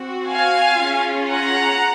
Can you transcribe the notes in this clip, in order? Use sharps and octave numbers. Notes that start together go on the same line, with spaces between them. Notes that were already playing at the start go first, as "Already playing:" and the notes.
Already playing: C4 F#4
F5 G#5
C#4 F4 G#4
F#5 A#5